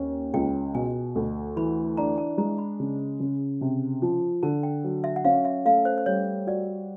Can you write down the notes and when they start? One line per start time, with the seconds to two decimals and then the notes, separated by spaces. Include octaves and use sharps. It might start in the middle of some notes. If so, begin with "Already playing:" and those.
Already playing: D#2 C#4
0.34 C#2 G5
0.75 B2 G#5
1.15 D2
1.56 E3 B5
1.97 D4 A#5
2.18 A5
2.38 G#3 A#5
2.58 B5
2.80 C#3
3.20 C#3
3.61 C3
4.02 F3
4.43 D3 A5
4.63 G5
4.84 F#3
5.04 E5
5.16 F#5
5.25 C#4 F5
5.45 E5
5.65 A3 F5
5.85 C5
5.98 C5
6.06 G3 C#5
6.47 F#4 D5